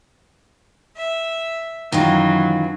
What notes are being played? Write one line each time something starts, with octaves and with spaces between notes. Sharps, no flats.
E5
F#2 D#3 E3 F#3 F4